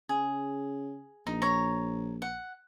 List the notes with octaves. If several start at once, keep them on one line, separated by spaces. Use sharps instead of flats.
C#3 G#4
A#1 D#4
C#5 A#5
F#5